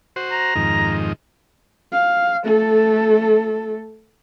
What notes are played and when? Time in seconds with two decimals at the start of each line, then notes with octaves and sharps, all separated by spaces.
0.16 F#4 C5
0.31 A#5
0.55 F2 G#2 D#3
1.92 F5
2.44 A3 A4